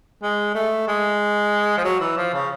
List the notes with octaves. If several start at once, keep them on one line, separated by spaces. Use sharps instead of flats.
G#3
A3
G#3
F3
F#3
E3
F3
C#3